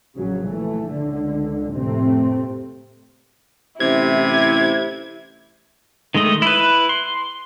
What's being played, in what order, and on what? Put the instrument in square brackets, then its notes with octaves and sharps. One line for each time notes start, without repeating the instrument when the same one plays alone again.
[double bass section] A#1 C#3 F#3
E3 A3
C#2 D3
F1 A2 C3 A3 C4
[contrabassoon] A1 [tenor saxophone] C3 [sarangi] E4 [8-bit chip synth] G#6
[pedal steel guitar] D#3 G#3 A3 D#5
E4 B4
C6